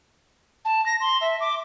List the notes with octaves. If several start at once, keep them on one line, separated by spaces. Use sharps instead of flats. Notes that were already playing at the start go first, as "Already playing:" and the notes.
A5
A#6
C6
E5
D6